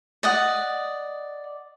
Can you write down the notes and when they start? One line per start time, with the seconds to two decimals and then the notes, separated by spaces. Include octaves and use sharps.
0.23 D5 D#5 F#5